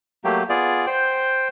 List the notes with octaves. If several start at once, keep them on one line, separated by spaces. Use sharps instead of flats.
F#3 A3 A#3 G4
B3 F4 G#4 D5
C5 G5